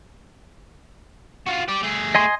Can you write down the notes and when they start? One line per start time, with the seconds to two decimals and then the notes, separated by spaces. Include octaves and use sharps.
1.47 F4 F#4
1.69 G4 D5
1.83 A3 G#4
2.15 D#5 G#5 C6